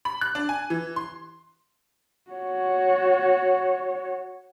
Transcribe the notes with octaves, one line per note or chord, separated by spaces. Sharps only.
B5
F#6
D4
G#5
E3
C6
F#4 C#5